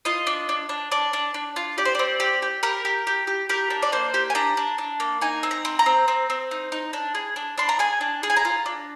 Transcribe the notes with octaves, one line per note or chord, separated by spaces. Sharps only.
F4 D#5
D4
D4
D4
D4 D5
D4
D4
F4
G4 D5
C5
C4 D5
G4
G4
G4 A#4
G4
G4
G4
G4 A#4
D4
D5
A#3 C5
G4
G#5
D4 A#5
D4
D4
A#3
D#4 G#5
C4
A#5
C4
A#5
C4
C4
C4
D#4
D#4
D4
G#4
D4
D4 C6
A#5
G#4 G#5
D4
G#4
G#5
A#5
F4
D4